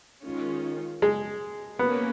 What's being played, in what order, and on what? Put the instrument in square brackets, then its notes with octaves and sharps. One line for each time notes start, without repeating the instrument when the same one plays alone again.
[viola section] D#3 G#3 C#4 F4
[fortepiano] G#3
[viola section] A#3 C#4 [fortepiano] B3